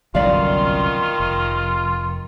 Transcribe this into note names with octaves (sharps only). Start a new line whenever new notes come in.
G1 C2 F#2 D#3 F4 D5 F5
F1